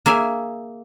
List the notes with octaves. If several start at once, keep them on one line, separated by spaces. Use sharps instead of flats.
A#3 G#4 E5 G#5